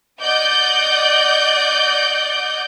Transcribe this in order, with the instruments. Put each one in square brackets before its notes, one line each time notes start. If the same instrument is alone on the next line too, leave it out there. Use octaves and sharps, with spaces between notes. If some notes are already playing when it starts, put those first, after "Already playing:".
[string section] D5 D#5 F#5 G6